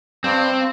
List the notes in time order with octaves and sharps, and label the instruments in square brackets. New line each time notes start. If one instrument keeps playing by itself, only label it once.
[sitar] G2 [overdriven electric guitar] C4